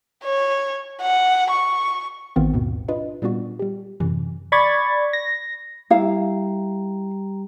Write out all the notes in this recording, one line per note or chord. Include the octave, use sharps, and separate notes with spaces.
C#5
F#5
C#6
A1 D#3 B3 C4 F4 F5
D#2 G#2 B2
D4 F4 B4 D#5
A#2 G3 B3 D4 F4 F#4
G3 G4
F#2 A2 C3 E3
D5 B5 C#6 G#6 A6
A#6
G3 E4 G4 F5 A#5